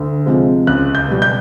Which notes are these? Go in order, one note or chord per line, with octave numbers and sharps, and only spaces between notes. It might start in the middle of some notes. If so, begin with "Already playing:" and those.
Already playing: D2
C3 F3 G#3
C#2 F#6
G6
B2 G3
G6